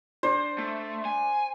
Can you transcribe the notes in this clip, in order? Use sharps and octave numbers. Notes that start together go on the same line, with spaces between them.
D4 C5
A3
G#5